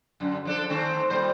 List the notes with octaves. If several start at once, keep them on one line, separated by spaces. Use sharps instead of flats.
F#2 D3
F3 D4 A4
D#3 A3 C4
A#2 G3 C5